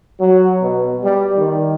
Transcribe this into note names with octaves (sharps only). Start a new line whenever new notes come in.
F#3
B2
G3
D#3